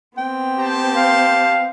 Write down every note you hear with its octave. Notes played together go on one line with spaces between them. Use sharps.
B3 C4 G5
G4 C5 A5
F5